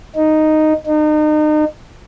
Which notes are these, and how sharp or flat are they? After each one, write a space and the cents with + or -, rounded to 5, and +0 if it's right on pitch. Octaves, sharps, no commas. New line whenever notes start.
D#4 -5
D#4 -35